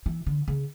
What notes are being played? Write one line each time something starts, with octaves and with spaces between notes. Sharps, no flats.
E3
D3
C#3